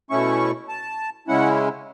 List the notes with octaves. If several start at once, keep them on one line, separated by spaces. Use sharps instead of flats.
B2 A3 C#4 E4 C#6
A5
C#3 G#3 C#4 E4 F#5